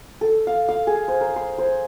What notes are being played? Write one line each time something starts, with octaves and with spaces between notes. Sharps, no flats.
A4
F5
F5
G#4
C5
A#4
C6
C5